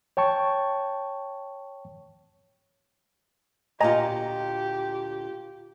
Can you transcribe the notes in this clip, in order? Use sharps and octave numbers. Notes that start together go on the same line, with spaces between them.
C#5 G5 A5 C#6
D2 A#2 F4 G4 D#5 G#5 A#5